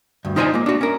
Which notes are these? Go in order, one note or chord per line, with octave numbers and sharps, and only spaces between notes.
D2 G2
D#4 F4 C5 D5 D#5 G#5
G#3 A#3
D4 F#4
C#4 A#4